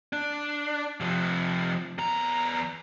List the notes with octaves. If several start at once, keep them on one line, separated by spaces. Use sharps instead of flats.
D4
C3 F3
E2 A#5